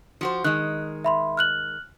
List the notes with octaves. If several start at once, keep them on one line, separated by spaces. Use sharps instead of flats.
F3 F#4 C5
D#3 G#3 F#6
E5 B5 C6
F6 F#6 F#7